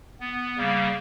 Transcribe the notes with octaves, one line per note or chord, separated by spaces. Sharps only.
B3
C#3 G3 A#3